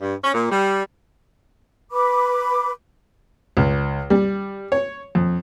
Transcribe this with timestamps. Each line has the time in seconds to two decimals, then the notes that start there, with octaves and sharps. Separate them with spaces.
0.01 G2
0.23 C#4
0.34 A#2
0.52 G3
1.91 B4 B5 D6
3.57 C#2
4.10 G3
4.72 C#5
5.15 F2